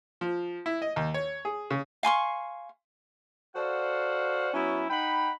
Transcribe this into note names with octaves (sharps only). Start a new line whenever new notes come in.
F3
E4
D#5
D#2
C#5
G#4
C#3
F5 G#5 C6 C#6
F#4 A4 C5 D5 F5 F#5
F#3 B3 C#4 E4
D#4 F#5 G5 B5